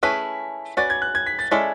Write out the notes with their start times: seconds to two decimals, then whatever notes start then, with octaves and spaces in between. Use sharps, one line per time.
0.03 A3 C#4 E4 G#4 B4 B6
0.77 C#4 F#4 B4 D5 A6
0.90 G#6
1.02 F#6
1.15 G#6
1.26 B6
1.39 A6
1.51 G#3 C#4 E4 A4 D5 B6